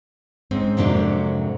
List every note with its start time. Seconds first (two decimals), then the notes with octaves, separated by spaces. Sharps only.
0.51 G#2 C4 C#4
0.77 F2 G#2 C3 F#3 A#3 D4